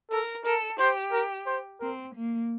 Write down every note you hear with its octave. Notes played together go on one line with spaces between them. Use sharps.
A4 A#4
A4 A#4
G4 C5
A#4
C5
C4 A#4
A#3